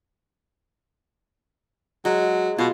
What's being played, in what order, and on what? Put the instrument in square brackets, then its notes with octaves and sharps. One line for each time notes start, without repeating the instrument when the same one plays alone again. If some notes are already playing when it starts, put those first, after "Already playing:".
[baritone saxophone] F#3 [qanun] G#3
[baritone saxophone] B2 [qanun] F4